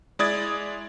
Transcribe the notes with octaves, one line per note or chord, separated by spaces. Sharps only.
G#3 E4 D5 D#6 G#6 A6